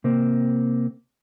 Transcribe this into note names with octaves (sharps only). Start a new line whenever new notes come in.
C3 A#3 C4